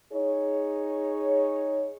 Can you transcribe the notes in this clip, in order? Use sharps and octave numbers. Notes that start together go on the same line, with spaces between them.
D#4 G#4 C#5